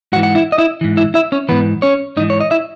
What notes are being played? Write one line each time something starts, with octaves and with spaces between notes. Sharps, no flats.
G#2 E3 F#4 F#5
F#5
E4 E5
D#5
E4 E5
G#2 E3
E4 E5
E4 E5
C#4 C#5
G#2 E3 B3 B4
C#4 C#5
G#2 E3 D#4 D#5
C#5
D#5
E4 E5